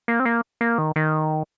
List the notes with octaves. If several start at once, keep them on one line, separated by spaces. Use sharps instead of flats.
A#3
C4
A#3
A#3
D#3
D#3